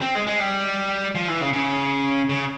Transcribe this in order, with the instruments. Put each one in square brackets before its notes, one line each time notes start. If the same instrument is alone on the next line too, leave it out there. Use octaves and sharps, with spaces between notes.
[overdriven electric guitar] C4
G#3
G#3
G3
F3
E3
C#3
C#3
C#3